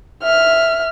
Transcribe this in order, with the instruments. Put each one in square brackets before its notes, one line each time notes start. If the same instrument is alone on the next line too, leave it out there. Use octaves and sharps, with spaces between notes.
[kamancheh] E5 F6